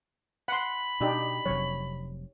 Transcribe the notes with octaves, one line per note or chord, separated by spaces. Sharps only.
F#5 B5 C6
B2 D4 D#4 G4
F1 C3 F#3 C#5